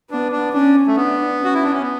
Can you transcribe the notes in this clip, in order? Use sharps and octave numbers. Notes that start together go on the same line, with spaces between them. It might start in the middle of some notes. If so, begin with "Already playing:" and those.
B3 D4
D4
C#4 D4
A3
B3 D4
C#4
F#4
E4
D4
C#4
B3